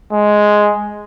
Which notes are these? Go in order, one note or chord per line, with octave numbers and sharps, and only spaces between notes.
G#3